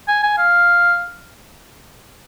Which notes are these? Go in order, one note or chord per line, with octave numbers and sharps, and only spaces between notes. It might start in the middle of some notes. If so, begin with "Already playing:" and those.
G#5
G#5
F5